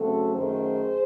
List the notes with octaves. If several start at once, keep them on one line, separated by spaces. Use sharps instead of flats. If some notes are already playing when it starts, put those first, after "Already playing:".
Already playing: C#3 F#3 A3 C4 F#4 A4
F#2 D#3 A3 G#4 C5